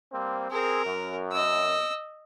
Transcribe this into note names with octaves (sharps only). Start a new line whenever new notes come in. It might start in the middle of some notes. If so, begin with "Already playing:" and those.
G3 A#3 C4
C4 G#4 A#4
F#2
D#5 E6